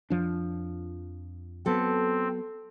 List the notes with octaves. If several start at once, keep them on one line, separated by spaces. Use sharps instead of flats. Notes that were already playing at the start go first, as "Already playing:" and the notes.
F2 F3 D4
F#3 B3 C4 A4